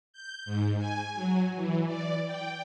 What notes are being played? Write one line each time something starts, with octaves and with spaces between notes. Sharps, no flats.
G6
G#2
G#5
F#3
E3
D5
G5